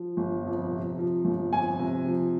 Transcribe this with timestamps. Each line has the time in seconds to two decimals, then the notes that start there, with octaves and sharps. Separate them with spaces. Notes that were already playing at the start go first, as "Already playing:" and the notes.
Already playing: F3
0.17 G1
0.44 F2
0.71 C3
0.98 F3
1.25 G1
1.52 F2 G#5
1.79 C3
2.06 F3